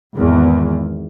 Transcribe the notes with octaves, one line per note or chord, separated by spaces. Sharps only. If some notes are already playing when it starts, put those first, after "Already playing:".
G#1 E2